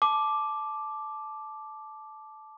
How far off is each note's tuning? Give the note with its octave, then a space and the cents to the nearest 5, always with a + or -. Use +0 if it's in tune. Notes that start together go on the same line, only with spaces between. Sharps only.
A5 -15 D6 +0